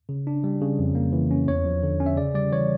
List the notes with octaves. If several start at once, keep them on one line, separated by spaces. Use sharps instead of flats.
C#3
D4
G3
C#3
F2
A#3
E3
C#4
E2 C#5
F3
D3
C#4
E5
C#3 D5
G3 D5
E3 C#5